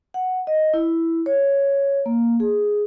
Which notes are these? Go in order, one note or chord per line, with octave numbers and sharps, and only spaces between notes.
F#5
D#5
E4
C#5
A#3
G#4